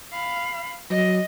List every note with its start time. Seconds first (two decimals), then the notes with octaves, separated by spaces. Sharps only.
0.12 F5 B5
0.90 F#3 D#5